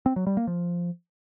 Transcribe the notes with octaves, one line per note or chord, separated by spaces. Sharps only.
C4
F#3
G3
A#3
F3